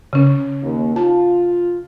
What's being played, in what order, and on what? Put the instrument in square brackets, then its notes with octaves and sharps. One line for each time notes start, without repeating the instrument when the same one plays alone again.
[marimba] C#3 C#4
[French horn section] D#2
[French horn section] F4 [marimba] A5